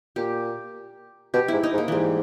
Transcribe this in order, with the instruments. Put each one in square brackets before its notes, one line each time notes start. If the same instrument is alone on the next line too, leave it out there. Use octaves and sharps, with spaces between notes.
[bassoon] A#2 [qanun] G4
[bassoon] B2 [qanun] G4
[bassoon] G#2 [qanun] E4
[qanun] D#4
[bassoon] G#2
[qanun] A#3
[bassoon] A#2 [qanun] E3
[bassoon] G#2 [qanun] G3